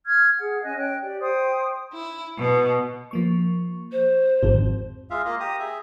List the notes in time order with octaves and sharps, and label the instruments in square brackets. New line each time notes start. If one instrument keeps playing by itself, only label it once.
[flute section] F6 G#6
G#4 F#5
C#4 D#5 G#5 F#6
C#5 G5 F#6
G4 D5
C5 G5 D#6
[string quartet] E4
B2
[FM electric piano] F3 A#3 C#6
[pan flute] C5
[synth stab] G#1 [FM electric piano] F2 C4
[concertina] G#3 F4 E5 F5
A#3 F4 D#5 F5
G4 A#5 D#6
G#4 E5